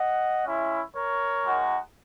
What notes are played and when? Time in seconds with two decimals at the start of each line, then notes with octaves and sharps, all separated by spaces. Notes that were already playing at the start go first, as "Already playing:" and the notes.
Already playing: D#5 F#5
0.46 G#3 C#4 E4
0.95 A#4 C#5
1.44 G#3 D#4 F#4